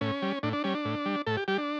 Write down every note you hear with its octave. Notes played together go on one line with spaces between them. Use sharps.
A2 C#4
G3
A2 D4
D4
G3 C#4
D4
A2
G3
A2 A4
G4
G3 G4
D4